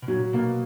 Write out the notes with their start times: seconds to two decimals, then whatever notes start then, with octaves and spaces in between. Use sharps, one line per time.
0.02 B2
0.08 A#2 F#3
0.33 B2 A#3